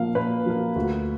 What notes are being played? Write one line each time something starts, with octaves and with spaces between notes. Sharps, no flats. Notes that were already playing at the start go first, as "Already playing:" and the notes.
Already playing: A#2 F3 A#3 F5
A#2 B4
F3 A#3
D2